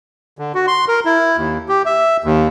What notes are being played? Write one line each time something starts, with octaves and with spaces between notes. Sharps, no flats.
D3
F#4
C6
A#4
E4
D#2
G4
E5
D#2